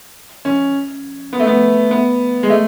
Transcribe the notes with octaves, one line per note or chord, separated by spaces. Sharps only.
C#4
B3
A3
B3
B3
G#3
A3